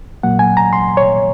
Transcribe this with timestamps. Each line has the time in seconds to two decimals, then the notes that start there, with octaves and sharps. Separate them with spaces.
0.23 A#2 F#3 A#3 F#5
0.39 G#5
0.57 A#5
0.73 C6
0.97 C#5